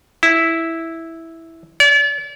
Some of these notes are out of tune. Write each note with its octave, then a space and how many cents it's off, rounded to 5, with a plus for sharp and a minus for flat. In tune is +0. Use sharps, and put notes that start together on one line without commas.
E4 -5
D5 -40